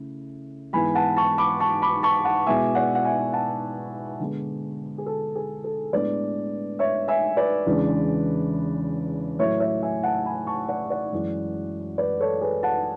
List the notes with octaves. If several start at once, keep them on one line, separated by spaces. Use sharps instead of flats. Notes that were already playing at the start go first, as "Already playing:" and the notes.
Already playing: C#3 A3 E4
G#2 E3 B3 E4 G#5 B5
F#5 A5
A5 C#6
B5 D6
A5 C#6
B5 D6
A5 C#6
F#5 A5
B2 G#3 B3 E4 E5 G#5
D5 F#5
F#5
E5 G#5
F#5 A5
D3 G#3 B3
G#4
A4
G#4
A4
A2 G#3 B3 D4 B4 D5
C#5 E5
E5 G#5
B4 D5
E2 C#3 E3 G#3 D4
A2 F#3 A3 E4 C#5 E5
C#5 E5
E5 G#5
F#5 A5
G#5 B5
A5 C#6
D5 F#5
D5 F#5
F#2 E3 G#3
B4 D5
A4 C#5
G#4 B4
F#5 A5